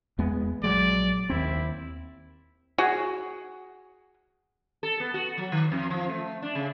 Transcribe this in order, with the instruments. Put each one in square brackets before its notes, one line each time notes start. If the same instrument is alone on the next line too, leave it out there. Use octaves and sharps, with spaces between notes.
[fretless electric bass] E2 G#3 B3
[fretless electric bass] A#1 F#3 G#3 [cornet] D5
[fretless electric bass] D#2 C4 [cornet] E4
[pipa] F#4 G#4
[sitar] A4
B3
F#4
F#3
D#3
F2
F3
A3
D4
C#3